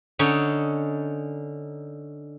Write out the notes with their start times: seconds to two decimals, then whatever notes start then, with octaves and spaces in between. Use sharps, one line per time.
0.19 D3 C#4 D#4